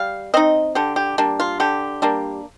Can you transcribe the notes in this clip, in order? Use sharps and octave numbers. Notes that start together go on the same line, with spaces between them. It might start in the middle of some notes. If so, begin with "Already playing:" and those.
Already playing: G3 F5
C4 D#4 D#5
D3 G4
G4
G3 A#3 D4
F4
D3 G4
G3 A#3 D4